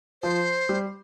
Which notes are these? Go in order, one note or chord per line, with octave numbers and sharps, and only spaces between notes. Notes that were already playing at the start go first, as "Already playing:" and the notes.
F3 C5
G3